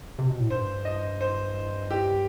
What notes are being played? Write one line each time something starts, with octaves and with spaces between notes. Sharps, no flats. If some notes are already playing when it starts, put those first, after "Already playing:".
C3
B2
A2
G2 C5
D#5
C5
G4